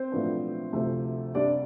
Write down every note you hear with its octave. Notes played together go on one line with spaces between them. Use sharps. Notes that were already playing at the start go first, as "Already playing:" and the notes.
Already playing: C4 C5
B1 A2 F3 B3 D4
D2 C3 F3 A3
C2 C3 G3 D4 D5